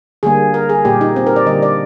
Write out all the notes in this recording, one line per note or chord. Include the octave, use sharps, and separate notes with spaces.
D3 G3 A#3 G#4
A#4
G#4
A#2 G3 A#3 G4
D#4
C4
A#4
D5
D3 G3 A#3 D#5
D5